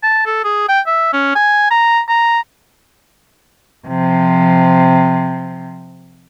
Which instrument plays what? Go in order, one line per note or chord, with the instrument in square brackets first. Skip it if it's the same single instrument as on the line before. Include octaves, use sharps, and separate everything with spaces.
[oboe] A5
A4
G#4
G5
E5
C#4
G#5
A#5
A#5
[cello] C3 F3